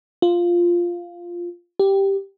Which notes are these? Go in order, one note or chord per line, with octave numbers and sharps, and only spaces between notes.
F4
G4